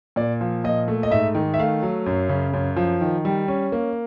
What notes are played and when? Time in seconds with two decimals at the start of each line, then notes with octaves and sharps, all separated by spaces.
0.16 A#2 D5
0.41 F3
0.64 A#2 D#5
0.88 A3
1.03 D#5
1.11 G#2 E5
1.35 D#3
1.54 E5
1.59 A3 F5
1.83 F#3
2.06 F#2
2.29 C#3
2.53 F#2
2.77 F3
3.01 D#3
3.25 G3
3.48 C#4
3.72 A#3